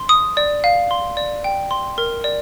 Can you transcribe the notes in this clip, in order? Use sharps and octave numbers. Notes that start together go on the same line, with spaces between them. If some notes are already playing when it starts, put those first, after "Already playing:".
Already playing: C6
D#6
D5
F5
C6
D5
G5
C6
A#4
D5